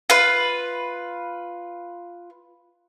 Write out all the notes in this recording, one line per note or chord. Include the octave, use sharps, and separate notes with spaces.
F4 B4